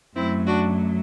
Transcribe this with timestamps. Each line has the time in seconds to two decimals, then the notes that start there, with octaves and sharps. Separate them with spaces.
0.16 F#2 F#3 A3 C4 E4
0.46 D4 F#4